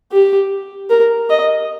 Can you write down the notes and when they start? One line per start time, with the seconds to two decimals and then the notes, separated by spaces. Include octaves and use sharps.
0.12 G4
0.90 A#4
1.30 D#5